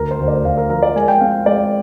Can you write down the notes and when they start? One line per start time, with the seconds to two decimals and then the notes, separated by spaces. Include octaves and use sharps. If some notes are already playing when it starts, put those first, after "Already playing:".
Already playing: D2 A#4
0.11 C5
0.19 D2
0.28 D5
0.45 D2 F5
0.57 A#4
0.70 F3 A#4
0.83 D5
0.95 G#3 G#5
1.08 G5
1.21 C4 F5
1.46 G#3 D5